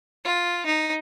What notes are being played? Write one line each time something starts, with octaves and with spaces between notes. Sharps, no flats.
F4
D#4